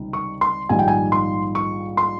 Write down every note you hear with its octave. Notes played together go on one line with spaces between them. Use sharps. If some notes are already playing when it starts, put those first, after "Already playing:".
Already playing: C#2 C3 D#3 G3
C#6
C6
A#1 G#2 D#3 G3 G#5
G5
G#5
C6
C#6
C6